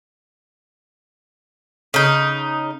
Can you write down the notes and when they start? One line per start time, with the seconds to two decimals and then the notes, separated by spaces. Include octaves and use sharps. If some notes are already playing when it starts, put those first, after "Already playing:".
1.94 C#3 D#4